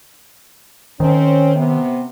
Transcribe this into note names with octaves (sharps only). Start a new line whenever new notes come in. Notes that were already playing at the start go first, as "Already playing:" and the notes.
D#3 C4 C#4
C3 B3